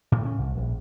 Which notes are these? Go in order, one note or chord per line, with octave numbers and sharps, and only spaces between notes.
A2
C#4
C2
A#1